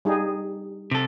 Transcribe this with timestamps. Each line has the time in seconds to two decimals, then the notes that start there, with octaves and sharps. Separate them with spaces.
0.05 G3 D#4 G#4
0.91 C3 A4